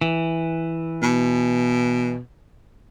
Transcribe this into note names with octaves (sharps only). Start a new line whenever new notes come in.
E3
B2